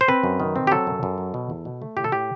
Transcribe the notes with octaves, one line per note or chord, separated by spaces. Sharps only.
C5
C4 B4
F#2
D#3
C4
G4
F#3 A4
F#2
F#2
F#3
B2
E2
B2
A3
A2 G4
A4
A2 G4